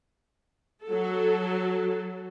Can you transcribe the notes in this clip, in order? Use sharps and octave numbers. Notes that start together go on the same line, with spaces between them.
F#3 A4